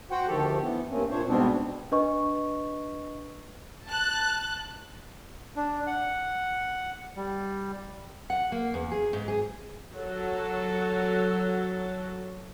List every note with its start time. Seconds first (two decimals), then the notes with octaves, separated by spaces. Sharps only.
0.11 F#4 C5 F#5 G5
0.27 D2 D#3 F3 G4 A4
0.62 E3 B3
0.90 G2 A3 A#3 C4 C#4
1.10 A#2 D4 C5 C#5
1.27 G#2 B2 G3 B3 C4 D4
1.92 D4 B4 D#5 C#6
3.87 A5 F#6
5.56 D4
5.87 F#5
7.17 G3
8.30 F#5
8.52 A#3
8.74 E2
8.92 G#4
9.13 G#2
9.28 G#4
9.94 F#3 A4